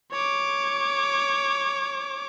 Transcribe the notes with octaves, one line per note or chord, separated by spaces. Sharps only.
C#5 D6